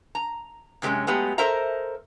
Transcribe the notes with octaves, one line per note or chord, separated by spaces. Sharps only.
A#5
F#2 C3 F3 G#3 C#4
F#3 G#3 A3 B3 G4
A4 A#4 C5 D#5 E5 A#5